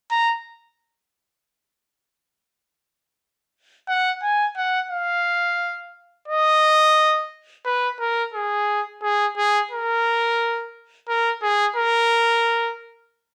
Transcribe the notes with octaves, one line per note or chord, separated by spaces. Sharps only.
A#5
F#5
G#5
F#5
F5
D#5
B4
A#4
G#4
G#4
G#4
A#4
A#4
G#4
A#4